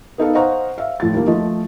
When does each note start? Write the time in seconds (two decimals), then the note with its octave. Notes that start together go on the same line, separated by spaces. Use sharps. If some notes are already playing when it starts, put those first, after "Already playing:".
0.18 B3 D#4 A4 F5
0.35 C5 D#5 F5 F#5 A#5 C#6
0.78 E5 F5
1.00 A2 F3 A3 A6
1.14 D#2 A#3
1.27 F3 A3 D#5